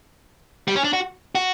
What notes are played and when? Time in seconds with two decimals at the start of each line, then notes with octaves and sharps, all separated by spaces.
0.68 G3
0.76 C#4
0.84 D4
0.93 F#4
1.35 F#4